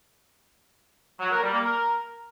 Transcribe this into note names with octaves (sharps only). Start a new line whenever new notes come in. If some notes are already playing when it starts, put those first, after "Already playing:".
F#3
A#4
G3
A#3
A#4